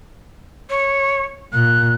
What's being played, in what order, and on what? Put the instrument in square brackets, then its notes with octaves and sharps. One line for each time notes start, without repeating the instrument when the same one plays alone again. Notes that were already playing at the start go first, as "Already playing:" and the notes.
[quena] C#5
[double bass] A#2 [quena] F#6